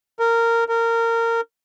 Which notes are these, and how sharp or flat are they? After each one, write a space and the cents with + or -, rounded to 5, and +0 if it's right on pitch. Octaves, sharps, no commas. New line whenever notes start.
A#4 -15
A#4 -20